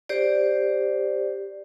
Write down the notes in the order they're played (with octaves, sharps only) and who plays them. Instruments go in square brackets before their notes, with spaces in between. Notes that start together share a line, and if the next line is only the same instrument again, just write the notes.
[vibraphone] G4 C5 D5